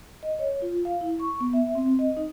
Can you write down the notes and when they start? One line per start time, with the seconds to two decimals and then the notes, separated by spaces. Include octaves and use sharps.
0.23 D#5
0.39 C#5
0.62 F4
0.85 F5
1.01 E4
1.20 C#6
1.40 B3
1.53 E5
1.75 C4
1.99 D#5
2.17 D#4